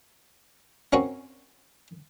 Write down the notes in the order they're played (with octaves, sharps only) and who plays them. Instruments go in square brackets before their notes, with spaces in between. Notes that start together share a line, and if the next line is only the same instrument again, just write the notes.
[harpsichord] A#3 C4 C#4 F#4